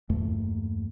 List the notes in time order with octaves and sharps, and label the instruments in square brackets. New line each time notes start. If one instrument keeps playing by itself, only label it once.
[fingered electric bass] E2 G2 A3 A#3